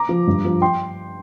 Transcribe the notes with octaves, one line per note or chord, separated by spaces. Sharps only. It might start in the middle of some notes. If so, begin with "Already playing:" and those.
Already playing: A#5 D6
F3
G2
F3
G5 C6